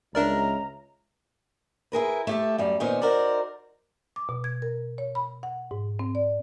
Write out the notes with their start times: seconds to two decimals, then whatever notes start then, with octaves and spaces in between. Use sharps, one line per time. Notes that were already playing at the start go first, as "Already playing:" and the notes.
0.15 C#2 D4 A#4 C#5 D5 E5 A#5 F6
1.92 E4 G#4 A#4 B4
2.27 A3 G4 A4
2.58 F#2 G3
2.80 A#2 D#3 B3 C#4 C5
3.02 D#4 F#4 A#4 C5 D5
4.16 D6
4.29 B2
4.44 G#6
4.62 A#4
4.98 C#5
5.15 B5
5.43 F#5
5.71 G#2
5.99 C4
6.15 D5